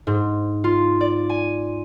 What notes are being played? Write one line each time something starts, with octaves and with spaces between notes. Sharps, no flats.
G#2
F4
D5
G#5